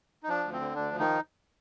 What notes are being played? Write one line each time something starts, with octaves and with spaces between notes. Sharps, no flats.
D#4
F3 D4
D2
C4
D3
D2 D4
F3
D#3 D#4